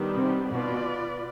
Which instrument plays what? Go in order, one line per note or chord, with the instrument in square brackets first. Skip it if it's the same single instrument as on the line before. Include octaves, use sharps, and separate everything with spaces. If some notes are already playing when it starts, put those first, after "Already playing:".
Already playing: [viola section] D#3 G3 B3 D4 G4
[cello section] C3
[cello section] B2 [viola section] B3 F4 B4 D5